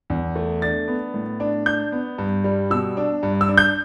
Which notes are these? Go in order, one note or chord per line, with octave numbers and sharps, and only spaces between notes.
E2
A3
D4 A6
B3
A2
D4
D4 G6
B3
G2
G3
B2 E6
D4
G2
E6
D4
G6